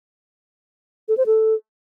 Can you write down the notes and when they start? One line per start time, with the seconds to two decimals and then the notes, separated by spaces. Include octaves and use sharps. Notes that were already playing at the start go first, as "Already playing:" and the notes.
1.08 A4
1.17 C5
1.26 A4